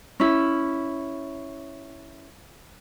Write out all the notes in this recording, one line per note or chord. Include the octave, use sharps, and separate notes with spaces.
C#4 E4